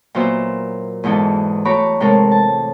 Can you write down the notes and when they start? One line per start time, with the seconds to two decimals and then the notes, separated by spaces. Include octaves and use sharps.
0.15 A#2 F#3 B3 C5 E5
1.04 E2 G#2 B2 E3 A4
1.65 A3 F#4 C#5 A#5 B5 D6
2.00 A2 C3 G#3 A4 A#4
2.32 A5